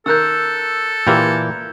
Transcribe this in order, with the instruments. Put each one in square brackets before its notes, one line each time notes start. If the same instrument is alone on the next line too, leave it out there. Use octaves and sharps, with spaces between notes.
[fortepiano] D#3 A#4 [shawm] A4 [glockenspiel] E6 F#6 G6
[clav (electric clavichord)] A#2 E3 [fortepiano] G4 A#4 [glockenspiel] G6 G#6